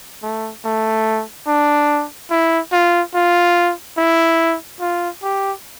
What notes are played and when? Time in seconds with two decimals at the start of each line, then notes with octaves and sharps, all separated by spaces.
0.23 A3
0.65 A3
1.47 D4
2.30 E4
2.72 F4
3.14 F4
3.98 E4
4.80 F4
5.23 G4